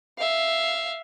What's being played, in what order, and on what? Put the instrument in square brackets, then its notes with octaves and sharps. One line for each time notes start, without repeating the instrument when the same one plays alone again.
[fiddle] E5 F5